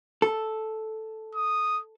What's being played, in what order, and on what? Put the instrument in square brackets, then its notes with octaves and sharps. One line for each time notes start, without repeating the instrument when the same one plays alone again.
[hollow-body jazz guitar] A4
[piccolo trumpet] D#6